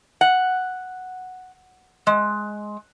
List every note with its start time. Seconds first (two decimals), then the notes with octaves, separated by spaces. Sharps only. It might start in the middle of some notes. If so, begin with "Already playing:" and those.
0.21 F#5
2.07 G#3